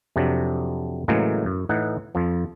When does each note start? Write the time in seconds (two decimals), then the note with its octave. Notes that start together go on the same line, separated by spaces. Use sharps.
0.16 F2 C3 F#3 D4
1.08 A2 C#3 E3 F#3 G#3 A#3
1.46 F#2
1.69 A2 E3 D#4 F#5
2.15 F2 F3